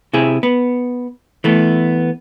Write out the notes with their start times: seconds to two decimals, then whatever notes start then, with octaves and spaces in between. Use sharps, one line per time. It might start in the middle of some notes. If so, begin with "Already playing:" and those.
0.13 C3 E4 G#4
0.43 B3
1.44 E3 A3 B3